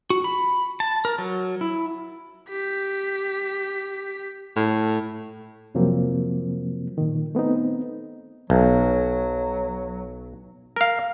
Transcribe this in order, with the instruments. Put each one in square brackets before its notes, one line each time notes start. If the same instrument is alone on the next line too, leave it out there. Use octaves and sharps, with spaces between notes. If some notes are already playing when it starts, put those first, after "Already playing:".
[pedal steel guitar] F#4
B5
A5
A#4
F#3
E4
[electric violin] G4 B6
[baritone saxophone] A2
[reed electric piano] F2 C3 F3 F#3 A#3 C4
A#2 D#3
A3 B3 C4 D#4
[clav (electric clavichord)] B1 [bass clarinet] F#3
[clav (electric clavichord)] A#4 F5